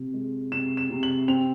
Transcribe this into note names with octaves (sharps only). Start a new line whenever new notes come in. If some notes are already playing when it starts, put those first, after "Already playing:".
Already playing: C3
G#3
C3 E7
E7
C3
F#7
C4 F7